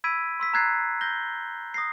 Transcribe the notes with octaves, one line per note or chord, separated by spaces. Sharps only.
B5 E6 G#6 B6 D7 D#7
C6 E6 B6
A#5 E6 F#6 G#6 A6 C7
G6 A#6 G7
D#6 A#6 C7